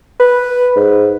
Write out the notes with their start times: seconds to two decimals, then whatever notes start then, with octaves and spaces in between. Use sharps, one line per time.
0.20 B4
0.76 G#2